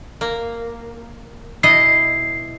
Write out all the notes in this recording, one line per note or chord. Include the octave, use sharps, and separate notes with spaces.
A#3
B2 E4 D#5 C7